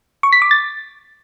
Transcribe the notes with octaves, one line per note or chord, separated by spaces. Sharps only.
C#6
B6
D6
A6